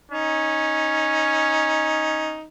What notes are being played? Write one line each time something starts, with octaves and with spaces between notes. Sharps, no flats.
C#4 D#4